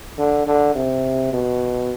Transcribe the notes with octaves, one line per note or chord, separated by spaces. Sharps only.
D3
D3
C3
B2